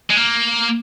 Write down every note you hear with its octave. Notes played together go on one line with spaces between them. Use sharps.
G#3
A#3